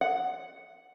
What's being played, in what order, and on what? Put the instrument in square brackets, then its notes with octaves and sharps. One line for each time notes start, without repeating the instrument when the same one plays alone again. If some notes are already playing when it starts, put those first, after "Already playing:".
[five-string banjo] F#5